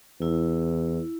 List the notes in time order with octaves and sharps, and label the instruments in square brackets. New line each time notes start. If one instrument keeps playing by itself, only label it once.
[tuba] E2 [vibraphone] E4